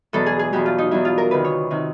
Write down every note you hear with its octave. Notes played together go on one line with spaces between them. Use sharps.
E2 B2 F#3 A4
G#4
G#4
E2 B2 F#3 G4
F4
D#4
E2 B2 F#3 E4
F4
A#4
D2 C3 D#3 B4
C#5
C3 D#3